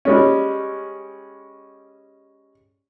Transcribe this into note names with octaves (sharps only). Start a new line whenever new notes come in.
G3 G#3 C#4